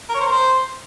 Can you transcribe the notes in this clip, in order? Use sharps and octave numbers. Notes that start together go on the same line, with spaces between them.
A#4
C#5
C5
A#4
C5